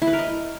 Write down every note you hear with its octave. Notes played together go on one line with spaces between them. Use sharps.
E4
B4
A#4
D#5